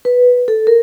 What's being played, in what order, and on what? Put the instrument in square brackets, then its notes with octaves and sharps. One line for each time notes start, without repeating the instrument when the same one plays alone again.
[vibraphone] B4
A4
A#4